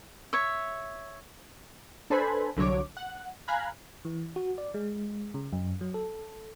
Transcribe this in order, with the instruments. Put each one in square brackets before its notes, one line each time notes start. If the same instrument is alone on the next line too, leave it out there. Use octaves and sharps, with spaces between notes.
[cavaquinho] C#5 E5
[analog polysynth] D4 A4 B4 C5 G#5 B5
C2 D3 F#3 C#5 D6
F#5
F5 G#5 A#5 B5 F#6
[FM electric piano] E3
F#4
D5
G#3
C#3
F#2
F#3
A4